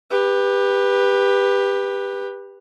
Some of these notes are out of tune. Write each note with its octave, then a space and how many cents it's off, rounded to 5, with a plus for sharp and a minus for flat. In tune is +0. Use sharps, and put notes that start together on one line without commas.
G4 +20 B4 -5